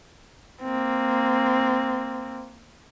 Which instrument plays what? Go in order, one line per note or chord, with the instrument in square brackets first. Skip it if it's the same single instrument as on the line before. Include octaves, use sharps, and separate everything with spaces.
[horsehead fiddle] A#3 C4